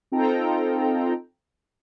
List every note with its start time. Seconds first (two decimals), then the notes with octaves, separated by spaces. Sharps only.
0.12 C4 D#4 F4 A4 G5 A#5